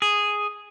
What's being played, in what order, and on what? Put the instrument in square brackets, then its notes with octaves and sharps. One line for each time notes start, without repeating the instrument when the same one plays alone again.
[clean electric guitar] G#4